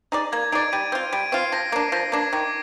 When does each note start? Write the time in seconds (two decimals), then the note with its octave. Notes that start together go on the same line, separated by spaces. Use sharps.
0.12 D#4 G#4 D5
0.32 A#3 G#6
0.52 D#4 G#4 D5 D7
0.72 G3 D#7
0.92 C4 F4
1.13 G3 D7
1.32 C4 F4 C7
1.52 F3 A#6
1.72 A#3 D4
1.92 F3 A#6
2.12 A#3 D4 G#6
2.33 D#3 D6